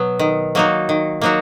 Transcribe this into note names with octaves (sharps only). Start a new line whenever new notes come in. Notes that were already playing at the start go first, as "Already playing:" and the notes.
Already playing: B2 F#3 B3
D#3
F#3 A#3 D#4 F#4
D#3
F#3 A#3 D#4 F#4